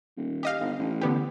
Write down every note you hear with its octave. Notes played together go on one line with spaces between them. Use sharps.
D#1
G4 D#5 F5
G1
A1
D3 B3 G4